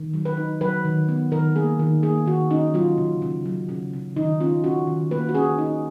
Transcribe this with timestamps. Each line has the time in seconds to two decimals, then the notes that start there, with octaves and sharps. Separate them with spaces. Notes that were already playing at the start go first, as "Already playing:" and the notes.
Already playing: D#3
0.14 F#3
0.25 B4
0.37 D#4
0.61 F#3 B4
0.85 D#3
1.09 B3
1.31 D#3 A#4
1.56 A#3 G#4
1.79 D#3
2.03 A#3 G#4
2.26 D#3 F#4
2.50 C#4 D#4
2.74 F#3 F4
2.98 C#3
3.22 C#3
3.46 F#3
3.69 C#3
3.93 C#3
4.16 D#3 D#4
4.40 C#4 F4
4.64 C#4 F#4
4.87 D#3
5.11 A#3 B4
5.29 F#4
5.35 C#4 G#4
5.58 D#4